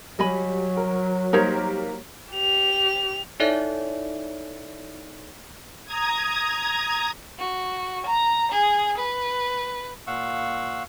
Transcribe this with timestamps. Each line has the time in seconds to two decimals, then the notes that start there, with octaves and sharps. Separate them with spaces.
0.19 F#3 G3 D#5 G#5 B5
0.77 A#4
1.33 G3 A#3 D#4 A#4 C5 C#5
2.32 G4 F7
3.40 D#4 E4 A4 C#5 D5 E5
5.86 A#5 D#6 G#6
7.39 F#4
8.06 A#5
8.52 G#4
8.98 B4
10.07 A#2 F5 F#5 C#6 E6